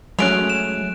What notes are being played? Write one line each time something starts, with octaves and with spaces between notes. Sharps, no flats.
F#3 G#3 A3 C#4 F#6 D7 F7
E7